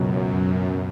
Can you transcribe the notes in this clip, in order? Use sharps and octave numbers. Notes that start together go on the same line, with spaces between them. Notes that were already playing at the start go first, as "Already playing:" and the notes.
Already playing: C#2 F#2 B2 F#3